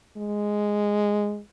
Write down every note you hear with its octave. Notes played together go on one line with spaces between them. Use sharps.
G#3